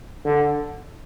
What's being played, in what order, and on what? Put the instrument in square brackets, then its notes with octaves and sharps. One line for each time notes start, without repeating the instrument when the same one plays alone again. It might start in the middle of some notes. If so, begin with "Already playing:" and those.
[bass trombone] D3